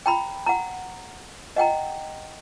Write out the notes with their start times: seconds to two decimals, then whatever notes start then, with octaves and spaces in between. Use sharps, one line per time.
0.06 G5 A#5 B5
0.46 F#5 A#5
1.56 D#5 F#5 G5 A#5